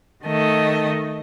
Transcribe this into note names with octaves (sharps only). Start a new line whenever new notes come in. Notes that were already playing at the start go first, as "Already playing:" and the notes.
D#3 A3 D#5